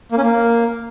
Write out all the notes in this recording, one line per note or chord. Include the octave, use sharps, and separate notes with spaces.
A#3
C#4
A#3